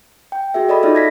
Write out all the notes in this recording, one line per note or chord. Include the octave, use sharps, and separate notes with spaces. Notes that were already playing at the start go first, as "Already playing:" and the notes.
G5
F#4 G#4 E5
A4 D5 D#5 B5
D#4 F4 D5 E5
G#6 A#6 B6